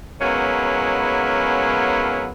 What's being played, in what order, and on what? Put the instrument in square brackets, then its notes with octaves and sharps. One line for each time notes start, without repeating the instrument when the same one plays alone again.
[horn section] F#3 G#3 A#3 B3 C#4 E4